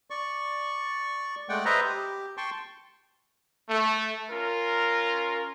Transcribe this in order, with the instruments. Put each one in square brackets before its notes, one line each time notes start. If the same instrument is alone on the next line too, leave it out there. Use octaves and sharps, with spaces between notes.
[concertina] D5 C#6
G#3 A3 D5 F#5 G5
B4 C5 D#5 E5 A#5
G4
G5 A5 C6 C#6
[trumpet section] A3
C#4 F4 A#4